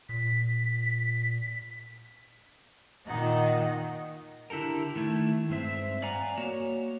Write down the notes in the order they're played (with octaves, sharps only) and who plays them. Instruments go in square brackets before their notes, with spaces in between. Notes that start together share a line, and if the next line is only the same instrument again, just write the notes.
[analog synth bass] A#2 [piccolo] B6
[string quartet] A#2 D#3 D#4 D#5 F#5
[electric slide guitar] D3 E4 G4 A4 A#4
D#3 A3 E4
G2 G#3 C4 E5
D5 F5 F#5 G#5 A#5
A#3 F#4 C#5